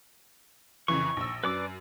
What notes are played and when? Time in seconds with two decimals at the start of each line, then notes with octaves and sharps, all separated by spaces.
0.88 F2 C#3 E3 C#6
1.17 A#1 E6
1.44 F#2 B4 D5 D6